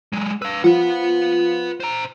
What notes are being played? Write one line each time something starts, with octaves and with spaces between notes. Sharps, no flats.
F#3 G#3
B4 F5 E6
F3 F4 B4 F#5
C5 A#5